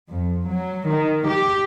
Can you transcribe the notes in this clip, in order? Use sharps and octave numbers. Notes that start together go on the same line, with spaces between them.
F2
F#3
D#3
G4